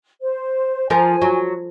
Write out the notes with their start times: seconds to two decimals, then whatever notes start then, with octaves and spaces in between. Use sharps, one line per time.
0.21 C5
0.90 F3 A#4 G#5
1.22 F#3